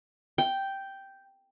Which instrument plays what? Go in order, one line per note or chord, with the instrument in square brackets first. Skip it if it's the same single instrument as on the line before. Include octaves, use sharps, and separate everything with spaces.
[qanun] G5